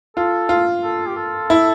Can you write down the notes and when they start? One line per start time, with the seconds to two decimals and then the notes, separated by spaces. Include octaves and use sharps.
0.17 F4 A4
0.49 F4
0.83 A4
1.08 G4
1.16 A4
1.50 E4